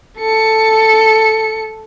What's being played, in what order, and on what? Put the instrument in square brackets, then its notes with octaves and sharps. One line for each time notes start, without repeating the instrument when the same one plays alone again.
[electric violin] A4 C#7